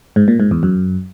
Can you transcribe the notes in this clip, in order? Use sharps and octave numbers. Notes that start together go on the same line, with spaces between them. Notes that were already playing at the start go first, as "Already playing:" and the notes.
G#2
A#2
G#2
E2
F#2